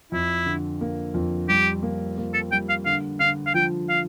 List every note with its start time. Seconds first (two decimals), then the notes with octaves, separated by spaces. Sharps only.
0.12 F2 E4
0.46 D3
0.81 A#3
1.14 F2
1.49 G3 G4
1.83 A#3
2.18 A#3
2.34 A4
2.52 G3 G5
2.69 F5
2.86 D3 F5
3.20 D3 F5
3.46 F5
3.54 F3 G5
3.90 F5